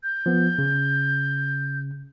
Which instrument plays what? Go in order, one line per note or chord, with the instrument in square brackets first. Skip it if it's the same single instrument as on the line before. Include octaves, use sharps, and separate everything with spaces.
[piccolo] G6
[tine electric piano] F3 B3
C#3